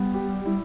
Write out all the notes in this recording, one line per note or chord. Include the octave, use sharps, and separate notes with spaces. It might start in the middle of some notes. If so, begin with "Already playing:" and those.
Already playing: G3 B3
G4
E4